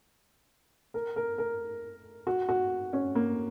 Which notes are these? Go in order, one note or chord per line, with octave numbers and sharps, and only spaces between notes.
A#4
A#4
A#4
F#4
F#4
C#4
A#3